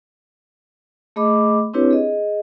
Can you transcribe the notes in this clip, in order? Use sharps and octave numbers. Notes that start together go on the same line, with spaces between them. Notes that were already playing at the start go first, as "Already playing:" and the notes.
A3 G#4 D#5 B5 D6
C4 D4 E4 G4 B4 C#5
G#4 D#5